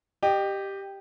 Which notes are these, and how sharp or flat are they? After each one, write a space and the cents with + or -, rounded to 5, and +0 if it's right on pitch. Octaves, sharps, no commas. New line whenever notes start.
G4 +0 D#5 -30